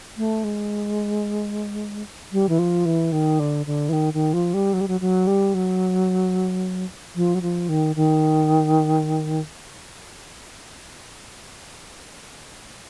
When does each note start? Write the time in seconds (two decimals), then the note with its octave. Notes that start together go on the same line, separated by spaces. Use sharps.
0.17 A3
0.44 G#3
2.32 G3
2.49 E3
2.59 F3
2.86 E3
3.12 D#3
3.40 D3
3.66 D3
3.89 E3
3.93 D#3
4.14 D#3
4.33 F3
4.54 G3
4.73 F#3
4.81 G3
4.88 F#3
5.01 F#3
5.27 G3
5.54 F#3
7.16 F3
7.35 F#3
7.42 F3
7.69 D#3
7.96 D#3